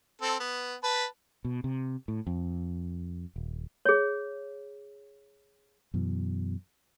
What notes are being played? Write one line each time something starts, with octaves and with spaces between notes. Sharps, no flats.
C4 A4
B3
B4 A5
B2
C3
A2
F2
D#1
G#4 C#5
F#2 B2 E3